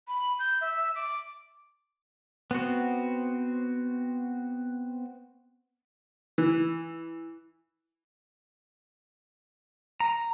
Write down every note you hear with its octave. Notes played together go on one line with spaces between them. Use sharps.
B5
G6
E5
D6
B3 C4 F#4
E3
A#5